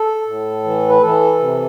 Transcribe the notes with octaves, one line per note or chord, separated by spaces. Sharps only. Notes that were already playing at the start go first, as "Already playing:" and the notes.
Already playing: A4
A2
E3
B4
E3 A4
C3